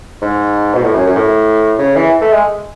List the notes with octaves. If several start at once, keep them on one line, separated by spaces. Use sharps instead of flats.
G#2
B2
A2
F#2
F#2
A2
C#3
E3
A3
G#3